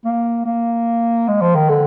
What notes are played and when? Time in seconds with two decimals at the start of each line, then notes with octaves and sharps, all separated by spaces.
0.05 A#3
0.46 A#3
1.28 G#3
1.41 F3
1.55 D#3
1.69 D3